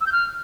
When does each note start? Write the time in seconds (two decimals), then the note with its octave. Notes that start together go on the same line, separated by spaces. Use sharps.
0.01 E6
0.06 G6
0.12 F6